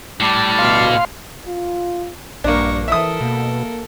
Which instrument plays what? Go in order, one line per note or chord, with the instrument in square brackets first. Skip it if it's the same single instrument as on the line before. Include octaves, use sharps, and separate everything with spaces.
[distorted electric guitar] A2 [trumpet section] G3 A5 D6
[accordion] D2 B2 F6 [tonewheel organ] F5 C6
[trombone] F4
[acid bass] A#1 [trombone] G2 [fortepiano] A#3 D4 [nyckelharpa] A#5 C#6
[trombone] E3 [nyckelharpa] A4 A#4 [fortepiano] E5 D#6
[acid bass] B2 [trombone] A#3